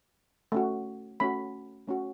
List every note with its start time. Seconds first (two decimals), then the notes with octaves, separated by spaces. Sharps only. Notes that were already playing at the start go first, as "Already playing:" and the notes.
0.52 A3 C#4 F#4
1.20 A3 C#4 F#4 B5
1.88 A3 C#4 F#4